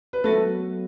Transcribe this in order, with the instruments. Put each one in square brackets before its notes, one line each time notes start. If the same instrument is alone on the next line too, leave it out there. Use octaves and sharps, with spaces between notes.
[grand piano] B4
[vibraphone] F#3 B3 F#4 C#5 [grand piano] A3 A4